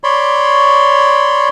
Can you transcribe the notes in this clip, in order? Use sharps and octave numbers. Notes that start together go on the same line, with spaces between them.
C#5 D5 B5 C6